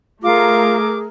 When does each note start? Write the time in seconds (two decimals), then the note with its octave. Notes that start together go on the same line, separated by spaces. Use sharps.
0.23 A3 F4 G#4 A#4 D6